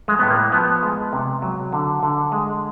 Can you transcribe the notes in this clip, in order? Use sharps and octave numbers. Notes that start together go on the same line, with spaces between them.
G#3
A2 B3
A#3
F3 B3
G#3
C3
F#3
D3
D3
G#3